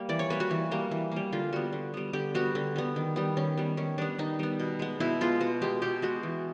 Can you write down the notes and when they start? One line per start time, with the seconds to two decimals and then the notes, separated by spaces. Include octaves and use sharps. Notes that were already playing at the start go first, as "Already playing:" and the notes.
Already playing: G3 A#3
0.09 E3 D5
0.19 C#5
0.30 G3 A#3 B4
0.40 F#4
0.51 E3
0.71 G3 A#3
0.91 E3
1.11 G3 A#3
1.32 D3 F4
1.53 G3 B3 F#4
1.72 D3
1.94 G3 B3
2.13 D3 G4
2.35 G3 B3 F#4
2.55 D3
2.76 G3 B3
2.96 D#3
3.16 G3 B3
3.37 D#3 C#4
3.57 G3 B3
3.77 D#3 C#4
3.98 G3 B3 D4
4.18 D#3 D#4
4.39 G3 B3
4.59 B2
4.79 G#3 B3
5.00 B2 E4
5.21 G#3 B3 F4
5.41 B2 F#4
5.61 G#3 B3 G4
5.82 B2 G4
6.02 G#3 B3 F#4
6.23 E3